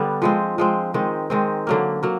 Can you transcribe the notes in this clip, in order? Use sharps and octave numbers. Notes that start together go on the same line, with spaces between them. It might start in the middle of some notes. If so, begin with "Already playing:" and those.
Already playing: D3 G3 B3 D4
F3 G#3 C4
F3 G#3 C4
D#3 G#3 C4
D#3 G#3 C4
D3 F#3 A#3
F#3 A#3